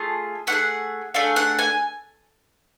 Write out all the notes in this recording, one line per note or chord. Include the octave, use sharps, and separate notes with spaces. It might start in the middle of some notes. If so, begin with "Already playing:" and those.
Already playing: A3 F4 G#4 A5
A3 D4 F#5
G#4
A3 D4 G#4 F5
F#5
G#5